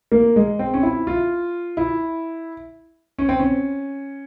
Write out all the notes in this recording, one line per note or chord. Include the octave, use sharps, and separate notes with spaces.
A#3
G#3
C4
C#4
E4
F4
E4
C#4
C4
C#4